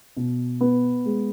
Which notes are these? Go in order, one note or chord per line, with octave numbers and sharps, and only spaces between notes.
B2
B3
G#3